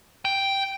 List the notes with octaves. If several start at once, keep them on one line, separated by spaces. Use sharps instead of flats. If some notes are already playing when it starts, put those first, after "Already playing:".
G5